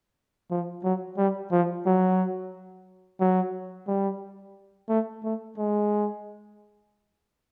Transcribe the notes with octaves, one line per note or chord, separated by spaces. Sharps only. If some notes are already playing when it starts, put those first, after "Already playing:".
F3
F#3
G3
F3
F#3
F#3
G3
A3
A3
G#3